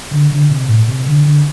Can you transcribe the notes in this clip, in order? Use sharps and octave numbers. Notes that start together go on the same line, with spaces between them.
D3
D3
C3
A2
C3
D3
D3